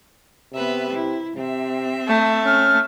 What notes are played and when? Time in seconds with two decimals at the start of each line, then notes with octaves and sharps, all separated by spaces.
0.53 C3 B3 B4 E5
0.92 E4
1.36 C3 C4 E5
2.08 A3
2.45 C#4 F6